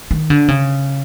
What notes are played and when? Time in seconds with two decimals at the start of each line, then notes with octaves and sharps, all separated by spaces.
0.11 D#3
0.30 D3
0.48 C#3